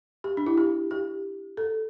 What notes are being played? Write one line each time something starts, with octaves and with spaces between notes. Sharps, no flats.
G4
D4
E4
G4
G4
A4